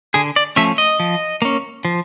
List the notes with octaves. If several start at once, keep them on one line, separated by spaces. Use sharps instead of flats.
D3 G#4
D5
F3 A3 C#4 E5
D#5
F3
A#3 C#4
F3